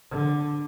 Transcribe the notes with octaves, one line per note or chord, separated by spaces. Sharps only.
D3